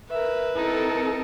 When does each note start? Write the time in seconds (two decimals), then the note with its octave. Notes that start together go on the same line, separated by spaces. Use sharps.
0.11 A#4 B4 E5
0.56 C4 D#4 E4 A4 A#4